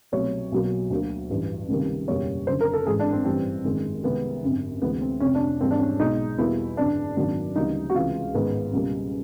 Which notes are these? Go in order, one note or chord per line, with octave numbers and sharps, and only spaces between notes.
C2 B2 F#3 A3 C#5
B1 B2 F#3 A#3
D2 D3 F#3 A#3
A1 G2 E3
C#2 C3 D#3 G3 A#3
F#1 E2 B2 G3 A#3 C#5
F#1 F#2 D3 C5
A#4
A4
A1 G#2 E3 G#3 G#4
D4
C4
A1 G2 E3 G3 C4
G#1 F#2 D#3 G#3
C2 C3 D#3 G#3 B3
G#1 F#2 D3
D2 C3 E3 G#3 B3
C4
F1 F2 C3 C#4
D4
G#1 G#2 E3 G3 A#3 C4
D4
C#4
B1 B2 G#3 D#4
E2 B2 G3 A#3 E4
G#1 F#2 D3 D4
G#1 F#2 D#3 F#3 A#3 D4
D2 C#3 E3 G3 A#3 D#4
F#4
C#2 C3 E3 G#3 F4
A1 G#2 D#3 G#3 B3
C#2 B2 G3 A#3